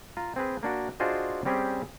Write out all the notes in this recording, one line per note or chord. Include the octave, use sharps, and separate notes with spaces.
F4 A#5
C4 G#4 B4
A#3 D4 F#4
D4 F4 F#4 G#4 C5 D#5
G3 C4 C#4 G4 G#4